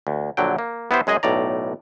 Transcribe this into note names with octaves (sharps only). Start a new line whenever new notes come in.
D2
A#1 D3 F#3 G5
A#3
B3 E4 G4 C5
F#2 G#3 G#4 D#5 G#5
B1 A2 D5 A#5